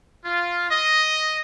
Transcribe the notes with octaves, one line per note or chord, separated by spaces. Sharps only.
F4
D#5